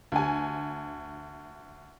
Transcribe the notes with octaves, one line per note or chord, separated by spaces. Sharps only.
D2 G#5